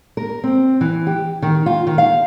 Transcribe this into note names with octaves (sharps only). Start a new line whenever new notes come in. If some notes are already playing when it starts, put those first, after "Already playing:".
A#4
C4
E3
G4
D#3
F4
D#3
F5